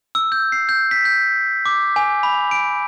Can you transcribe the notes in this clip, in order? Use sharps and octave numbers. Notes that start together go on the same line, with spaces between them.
E6
G6
C7
G6
B6
G6
D6
G#5
B5
D7